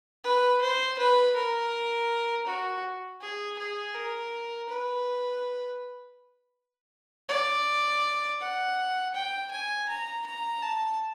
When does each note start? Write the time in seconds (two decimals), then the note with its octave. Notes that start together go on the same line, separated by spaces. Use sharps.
0.24 B4
0.61 C5
0.98 B4
1.35 A#4
2.47 F#4
3.21 G#4
3.59 G#4
3.95 A#4
4.69 B4
7.29 D5
8.41 F#5
9.15 G5
9.51 G#5
9.89 A#5
10.26 A#5
10.63 A5